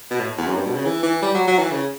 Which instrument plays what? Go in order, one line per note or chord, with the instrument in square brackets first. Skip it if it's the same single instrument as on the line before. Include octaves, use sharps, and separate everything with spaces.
[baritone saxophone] B2
A2
E2
F#2
G2
B2
C#3
E3
E3
G3
F#3
F#3
E3
C#3